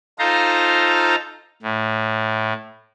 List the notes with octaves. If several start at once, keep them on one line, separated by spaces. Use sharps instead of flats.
D#4 F4 A4 C5 F5 A#5
A2